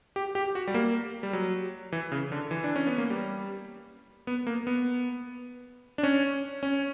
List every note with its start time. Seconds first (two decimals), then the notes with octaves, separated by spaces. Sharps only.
0.16 G4
0.35 G4
0.55 F#4
0.67 G3
0.74 A#3
1.23 G3
1.33 F#3
1.92 E3
2.12 C#3
2.32 D3
2.51 E3
2.64 D4
2.76 C#4
2.87 B3
2.98 A#3
3.10 G3
4.27 B3
4.47 A#3
4.67 B3
5.98 D4
6.03 C#4
6.63 C#4